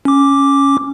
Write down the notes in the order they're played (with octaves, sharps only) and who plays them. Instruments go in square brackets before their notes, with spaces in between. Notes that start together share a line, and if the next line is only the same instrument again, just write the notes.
[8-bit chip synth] C#4 D6